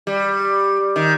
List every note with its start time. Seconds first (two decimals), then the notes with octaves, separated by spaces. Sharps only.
0.07 G3
0.96 D#3